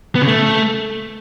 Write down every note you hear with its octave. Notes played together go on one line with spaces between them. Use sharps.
B3
C#3
A3